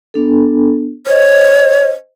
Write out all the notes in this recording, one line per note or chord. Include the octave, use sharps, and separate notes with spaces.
B3 D4 A4
C5 C#5 D#5